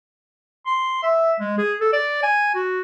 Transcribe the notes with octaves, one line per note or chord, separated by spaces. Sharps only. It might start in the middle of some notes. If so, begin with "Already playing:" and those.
C6
E5
G#3
G#4
A4
D5
G#5
F#4